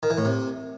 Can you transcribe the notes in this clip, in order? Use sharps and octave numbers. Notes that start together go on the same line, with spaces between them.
D#3
E3
A2
C3